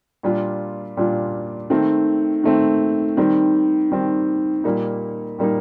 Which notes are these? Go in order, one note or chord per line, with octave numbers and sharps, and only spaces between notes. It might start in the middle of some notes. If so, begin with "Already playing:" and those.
A#2 G3 D4 F4
A#2 G3 D4 F4
D#3 A3 C4
D#3 A3 C4
D#3 G3 C4
D#3 G3 C4
A#2 G3 A#3 D#4
A#2 G3 A#3 D#4